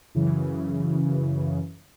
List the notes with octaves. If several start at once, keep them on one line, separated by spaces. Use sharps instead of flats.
F#2 C#3 E3